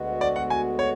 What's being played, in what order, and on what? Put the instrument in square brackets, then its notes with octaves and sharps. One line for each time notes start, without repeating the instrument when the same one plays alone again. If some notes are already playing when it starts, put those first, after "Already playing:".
Already playing: [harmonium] D2 D3 G#3 B3 F#4
[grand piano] D5
F#5
G#5
C#5